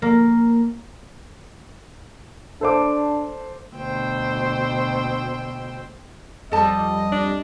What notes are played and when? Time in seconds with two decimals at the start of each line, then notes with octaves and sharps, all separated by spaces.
0.02 A#3
2.61 D4 A4 C5 D6
3.75 D2 B2 C5 G5 E6
6.52 F2 G3 A4 D#5 A5
7.12 D4